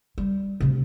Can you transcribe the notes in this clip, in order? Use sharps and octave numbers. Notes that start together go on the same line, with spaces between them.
G3
D2 C3